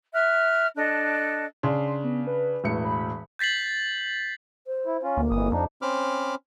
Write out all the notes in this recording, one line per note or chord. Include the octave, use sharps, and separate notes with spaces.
E5 F6 F#6
D4 A4 D#5 F#6
C#3 D4 C6
B3
B4
E1 A2 C#7
B5
G6 A6 B6 C7 F#7
C5
E4
C#4 F4
D2 A#3
G1 F2 E3 D#6
F2 F3 D4 D#4
C4 C#4 C5 B5 D6 F6